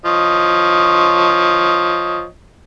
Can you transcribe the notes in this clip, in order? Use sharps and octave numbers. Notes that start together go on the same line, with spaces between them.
F3 C#5 D#5